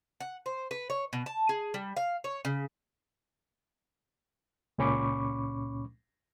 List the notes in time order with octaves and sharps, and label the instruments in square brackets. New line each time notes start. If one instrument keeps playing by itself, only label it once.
[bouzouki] F#5
C5
B4
C#5
B2
A5
G#4
G3
F5
C#5
C#3
[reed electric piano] C#2 A#2 C#4 B5 C#6 D6